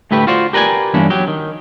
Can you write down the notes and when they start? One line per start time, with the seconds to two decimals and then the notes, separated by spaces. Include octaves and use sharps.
0.11 D2 A2 A3 G4 B4
0.27 F4 F#4 C5 D5
0.53 G4 A#4 B4 D5 G#5
0.94 E2 G2 E3 A#3 C#4 D4
1.10 F#3 G4
1.28 D#3